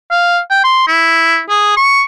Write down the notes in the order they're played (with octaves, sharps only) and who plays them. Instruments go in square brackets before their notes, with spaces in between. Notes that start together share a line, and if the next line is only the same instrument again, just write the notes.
[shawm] F5
G5
C6
E4
G#4
C#6